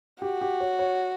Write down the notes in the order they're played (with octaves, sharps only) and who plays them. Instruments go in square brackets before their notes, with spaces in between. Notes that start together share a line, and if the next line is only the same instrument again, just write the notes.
[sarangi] F#4 [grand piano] G4
[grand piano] G4
C#5
C#5